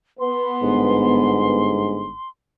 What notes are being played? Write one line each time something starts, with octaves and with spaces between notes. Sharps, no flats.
B3 C6
G1 G#2